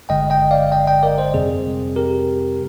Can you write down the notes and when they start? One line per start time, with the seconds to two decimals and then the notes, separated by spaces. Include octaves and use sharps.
0.09 G1 G2 D3 G#3 D#5 G5
0.30 D#5 G5
0.51 D5 F5
0.72 D#5 G5
0.87 D#5 G5
1.03 A#4 D5
1.18 C5 D#5
1.33 F2 C3 G3 C4 G#4
1.96 G4 A#4